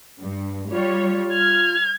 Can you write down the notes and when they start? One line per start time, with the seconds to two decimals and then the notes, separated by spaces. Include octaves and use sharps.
0.21 G2
0.71 G3 F4 C#5
1.34 F6 G#6